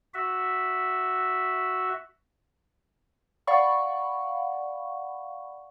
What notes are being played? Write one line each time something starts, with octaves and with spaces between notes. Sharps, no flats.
F#4 E5
D5 F5 F#5 B5 C#6